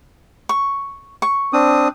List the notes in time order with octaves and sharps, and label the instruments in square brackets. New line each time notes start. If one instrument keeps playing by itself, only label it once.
[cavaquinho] C#6
C#6
[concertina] C4 D4 D#6